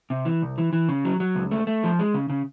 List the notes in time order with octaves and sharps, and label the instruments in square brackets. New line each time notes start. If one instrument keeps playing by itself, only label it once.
[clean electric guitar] C3
E3
C2
E3
E3
C#3
F#3
F#3
C#2
A3
A3
F3
G#3
C#3
C#3